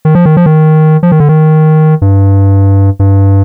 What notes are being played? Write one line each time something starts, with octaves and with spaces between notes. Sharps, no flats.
D#3
F3
D#3
F3
D#3
F3
D#3
D3
D#3
G2
G2